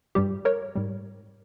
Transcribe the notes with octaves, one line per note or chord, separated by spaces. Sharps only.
G2 G3 G4
A#4 C#5
G#2 G3